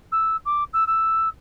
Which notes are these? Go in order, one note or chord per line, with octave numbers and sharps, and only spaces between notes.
E6
D6
E6
E6